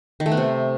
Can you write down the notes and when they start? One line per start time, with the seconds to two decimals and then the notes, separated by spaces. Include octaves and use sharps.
0.20 D#3
0.26 A3
0.31 B3
0.37 C3